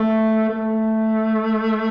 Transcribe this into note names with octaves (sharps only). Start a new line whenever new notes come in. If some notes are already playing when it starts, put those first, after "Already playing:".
Already playing: A3
A3